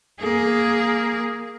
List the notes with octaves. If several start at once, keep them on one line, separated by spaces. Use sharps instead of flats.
A#3 G#4